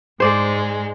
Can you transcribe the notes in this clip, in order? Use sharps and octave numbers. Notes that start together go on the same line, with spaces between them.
G#2 G#3 C5 D5